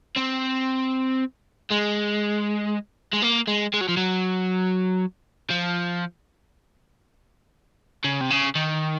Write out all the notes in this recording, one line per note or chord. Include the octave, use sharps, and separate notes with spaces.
C4
G#3
G#3
A#3
G#3
G#3
F#3
F3
F#3
F3
C#3
C3
C#3
D#3